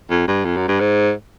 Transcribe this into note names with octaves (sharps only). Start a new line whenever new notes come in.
F2
G2
F2
F#2
G2
G#2